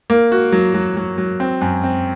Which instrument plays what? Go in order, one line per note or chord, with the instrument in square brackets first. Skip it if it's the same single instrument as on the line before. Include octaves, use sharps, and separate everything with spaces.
[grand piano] A#3
F#4
F#3
F#3
F#3
F#3
C4
F#2
C4